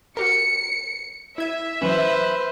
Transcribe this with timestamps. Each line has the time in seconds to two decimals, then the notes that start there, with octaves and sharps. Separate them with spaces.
0.17 F#4 G4 A#4 C#7
1.38 E4 E5 G#6 D#7
1.82 E3 F#3 C#4 B4 C5